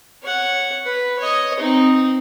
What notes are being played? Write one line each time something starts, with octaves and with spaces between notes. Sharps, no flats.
C#5 F#5
B4
C#5 D#5
C4 D#4